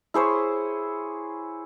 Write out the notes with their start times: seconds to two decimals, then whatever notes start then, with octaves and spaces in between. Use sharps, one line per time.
0.14 E4 G#4 C5 C#5